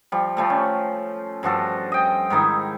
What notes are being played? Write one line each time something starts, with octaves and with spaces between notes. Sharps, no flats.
F3 G3
F3 G3 A3
C#4
G2 F3 F#4 A4
D#5 G5
G#2 D#3 D#4 E4